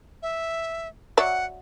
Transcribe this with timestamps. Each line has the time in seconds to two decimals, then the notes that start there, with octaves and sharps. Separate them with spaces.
0.22 E5
1.17 F#3 D5 E5 F#5